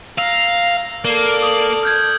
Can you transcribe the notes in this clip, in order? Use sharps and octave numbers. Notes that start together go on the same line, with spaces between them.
F5 A#5 E6
A#3 A4 D5
D#6 F#7
F6 G6 G#6